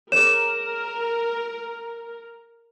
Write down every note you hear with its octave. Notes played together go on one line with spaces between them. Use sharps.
G#4 A#4 C#5 E7